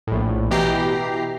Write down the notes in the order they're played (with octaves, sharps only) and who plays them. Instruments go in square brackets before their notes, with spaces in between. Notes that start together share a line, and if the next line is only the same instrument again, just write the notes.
[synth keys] A#1 A2
B2 E3 G4 A#5 C7